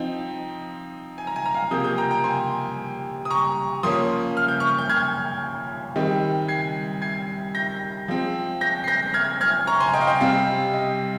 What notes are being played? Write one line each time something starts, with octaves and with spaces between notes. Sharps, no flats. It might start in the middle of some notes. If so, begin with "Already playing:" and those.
Already playing: F3 C4 D#4
G#5
A#5
G#5
A#5
F5 G#5
C3 F3 A#3 D#6 G6
D#6 G6
G5 A#5
G5 A#5
G#5 C6
D#6
A#5 C#6
F3 A#3 C#4 C6 D#6
F6
G6
C#6 F6
G6
F6 G#6
D#3 G3 C4 D#4
G#6 C7
G#6 C7
G6 A#6
F3 G#3 C4
G6 A#6
C7
G6 A#6
F6 G#6
F6 G#6
A#5 C#6
G#5 C6
D#5 G5
F5
D#5 G5
C3 G3 C4 F5
D#5